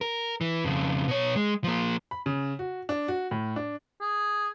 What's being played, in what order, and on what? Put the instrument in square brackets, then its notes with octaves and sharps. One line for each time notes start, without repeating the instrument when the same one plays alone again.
[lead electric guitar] A#4
E3
F2 C#3
B2 C#5
G#3
F3 A#3
[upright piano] B5
C#3
F#4
D4
F#4
A2
D4
[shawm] G#4